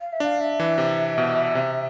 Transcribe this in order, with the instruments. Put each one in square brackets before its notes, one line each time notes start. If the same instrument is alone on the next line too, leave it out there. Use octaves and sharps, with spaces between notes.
[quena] F5
E5
[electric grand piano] D4 [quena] F5
[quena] E5
[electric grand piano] E3
C3
B2
C3